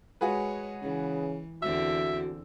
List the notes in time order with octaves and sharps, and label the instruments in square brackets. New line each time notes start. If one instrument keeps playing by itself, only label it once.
[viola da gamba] G#3 C#5 [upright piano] F#4 G#4 B4
[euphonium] C#3 [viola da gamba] E3
[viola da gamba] E2 D3 C4 [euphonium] F#4 [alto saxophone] E5 [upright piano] E6